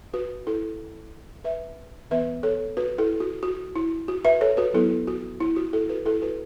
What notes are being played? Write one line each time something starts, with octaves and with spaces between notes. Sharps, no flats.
F#4 B4
E4 A4
B4 E5
E3 B3 B4 E5
A4 C#5
F#4 B4
E4 A4
F#4
F#4
E4
F#4
B4 E5
A4 C#5
F#4 B4
F#3 B3 E4 A4
F#4
E4
F#4
E4 A4
F#4 B4
E4 A4
F#4 B4